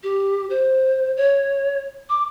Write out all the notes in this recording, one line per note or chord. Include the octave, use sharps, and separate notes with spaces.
G4
C5
C#5
D6